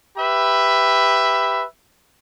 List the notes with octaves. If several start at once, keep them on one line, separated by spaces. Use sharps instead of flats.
G4 B4 E5 B5